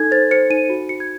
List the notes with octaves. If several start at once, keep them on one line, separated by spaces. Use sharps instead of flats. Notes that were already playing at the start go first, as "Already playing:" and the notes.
Already playing: D#4 A4 G#6
C5 A6
C5 C#7
D#4 D#7
F#4
F#4 C#7
G#6